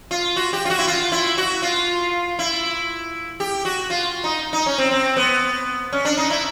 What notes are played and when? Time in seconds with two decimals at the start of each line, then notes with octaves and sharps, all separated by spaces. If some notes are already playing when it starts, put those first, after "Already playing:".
0.11 F4
0.36 F#4
0.53 G4
0.65 F4
0.70 F#4
0.79 E4
0.87 F4
1.12 E4
1.38 F#4
1.62 F4
2.39 E4
3.40 G4
3.65 F#4
3.90 F4
4.24 D#4
4.53 D#4
4.66 C#4
4.78 C4
4.91 C4
5.17 B3
5.93 C#4
6.05 D4
6.17 D#4
6.30 E4